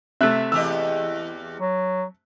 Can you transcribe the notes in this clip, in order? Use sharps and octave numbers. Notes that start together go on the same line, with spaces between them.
C3 A3 E5 F#6
E2 G4 D#5 E6
F#3